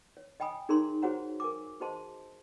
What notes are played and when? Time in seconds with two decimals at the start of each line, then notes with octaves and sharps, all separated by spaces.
0.17 C#5
0.40 D#5 G5 G#5 B5 D#6
0.69 D#4 G#4 A#4 C#5 A#5 C6
1.02 F#4 G#4 C5 C#5 F#5 A#5
1.40 A#4 G#5 D6
1.80 F#4 G#4 C5 D#5 A5 C6